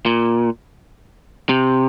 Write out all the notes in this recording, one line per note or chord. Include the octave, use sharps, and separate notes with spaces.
A#2
C3